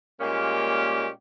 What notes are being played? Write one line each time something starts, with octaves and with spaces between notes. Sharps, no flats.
A#2 G3 G#3 A#3 C#4 G4